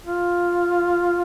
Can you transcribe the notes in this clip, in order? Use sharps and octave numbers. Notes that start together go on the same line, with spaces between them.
F4